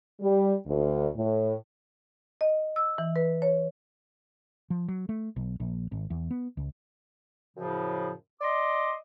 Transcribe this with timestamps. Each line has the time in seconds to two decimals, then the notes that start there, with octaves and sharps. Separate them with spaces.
0.21 G3
0.66 D2
1.16 A2
2.41 D#5
2.76 E6
2.98 E3
3.16 B4
3.42 C#5
4.70 F3
4.88 F#3
5.09 A3
5.36 B1
5.60 A#1
5.92 G#1
6.10 E2
6.31 B3
6.57 C#2
7.57 F#2 A2 C#3 F3
8.41 D5 D#5 C6 D6